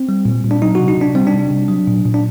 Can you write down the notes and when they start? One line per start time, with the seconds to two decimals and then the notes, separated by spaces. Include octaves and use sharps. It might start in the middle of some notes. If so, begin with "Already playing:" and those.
Already playing: C4
0.09 G3
0.25 A#2
0.44 A#2
0.51 D4
0.62 F#3 D#4
0.75 C3 F#4
0.88 D#4
0.97 C3 D4
1.15 G3 C4
1.27 D4
1.34 C3
1.51 C3
1.68 F#3
1.87 A#2
2.05 A#2
2.14 D4